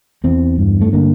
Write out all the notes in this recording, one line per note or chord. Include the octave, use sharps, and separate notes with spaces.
E2 C4
G2
A3
D3 A#3